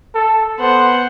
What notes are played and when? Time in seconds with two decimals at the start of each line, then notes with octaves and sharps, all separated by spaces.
0.15 A4
0.60 B3 C5 F#5